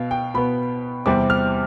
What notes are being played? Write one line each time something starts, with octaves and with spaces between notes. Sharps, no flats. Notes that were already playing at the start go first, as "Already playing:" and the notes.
Already playing: B2 B3 F5
G5
B2 B3 B5
E2 C3 G3 C4 D6
F6